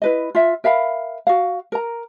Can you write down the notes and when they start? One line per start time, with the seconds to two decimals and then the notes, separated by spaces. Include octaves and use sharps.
0.02 E4 B4 D#5
0.35 F4 E5
0.64 A#4 E5 F5 B5
1.27 F#4 F5
1.72 A#4 A#5